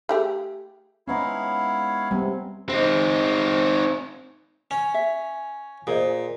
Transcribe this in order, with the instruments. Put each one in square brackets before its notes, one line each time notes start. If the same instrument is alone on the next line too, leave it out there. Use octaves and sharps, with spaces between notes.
[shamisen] A3 G4 G#4
[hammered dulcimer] G#3 B3 D#4 [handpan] C#4 [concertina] E4 C#5 F5
[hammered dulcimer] C3 [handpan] G3 B3
[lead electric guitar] C4 D#4
[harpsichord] C#4
[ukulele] E5
[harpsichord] A#2 [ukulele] G#4 C5 D#5